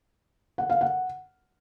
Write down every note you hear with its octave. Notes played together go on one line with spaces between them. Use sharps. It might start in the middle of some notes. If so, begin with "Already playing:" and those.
F#5
F5
F#5